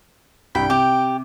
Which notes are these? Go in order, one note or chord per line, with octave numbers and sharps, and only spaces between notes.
C2 G2 G5 B5
C3 G4